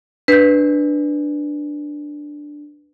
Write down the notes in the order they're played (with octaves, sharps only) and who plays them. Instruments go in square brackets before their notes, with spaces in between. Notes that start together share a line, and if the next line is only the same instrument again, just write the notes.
[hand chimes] D4 [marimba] B4 G6